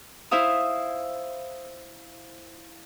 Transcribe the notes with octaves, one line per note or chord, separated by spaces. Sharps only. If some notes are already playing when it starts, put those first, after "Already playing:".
E4 C5 E5 F5 D#6